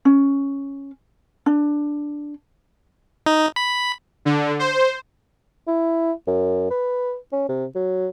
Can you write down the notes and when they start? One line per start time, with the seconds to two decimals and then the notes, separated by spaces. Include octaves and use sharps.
0.05 C#4
1.46 D4
3.26 D#4
3.56 B5
4.25 D3
4.59 C5
5.67 E4
6.27 F#2
6.70 B4
7.32 C#4
7.49 C3
7.75 F#3